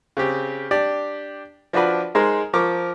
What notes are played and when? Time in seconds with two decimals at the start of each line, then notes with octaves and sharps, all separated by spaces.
0.17 C#3 C4 G4
0.71 D4 G4 D5
1.73 F3 D4 F4 F#4 B4 D5
2.15 G#3 D#4 G#4 A#4 C5
2.54 F3 A#4 C#6 D6